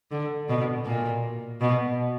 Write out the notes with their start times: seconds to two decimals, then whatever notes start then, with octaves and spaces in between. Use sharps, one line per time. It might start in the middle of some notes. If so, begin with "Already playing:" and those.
0.11 D3
0.49 B2
0.86 A#2
1.61 B2